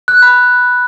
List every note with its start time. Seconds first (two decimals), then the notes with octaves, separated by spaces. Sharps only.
0.08 F#6
0.22 B5